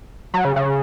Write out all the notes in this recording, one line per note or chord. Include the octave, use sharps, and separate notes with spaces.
F#3
C#3
C#3